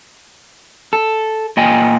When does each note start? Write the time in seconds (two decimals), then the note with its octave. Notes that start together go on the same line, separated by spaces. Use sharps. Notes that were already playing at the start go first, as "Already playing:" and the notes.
0.93 A4
1.57 A#2 D#5 G5 G#5